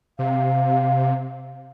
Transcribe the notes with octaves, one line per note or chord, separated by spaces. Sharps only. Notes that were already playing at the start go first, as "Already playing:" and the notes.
C3 F5